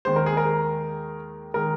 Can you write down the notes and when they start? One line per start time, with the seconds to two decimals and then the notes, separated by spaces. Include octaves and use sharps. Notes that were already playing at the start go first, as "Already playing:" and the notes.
0.05 D#2 D#3 G#3 C5
0.16 A#4
0.26 G#4
0.37 A#4
1.54 D#3 G#3 A#4